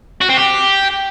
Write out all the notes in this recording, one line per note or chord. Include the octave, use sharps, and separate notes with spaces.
F#4
C4
G4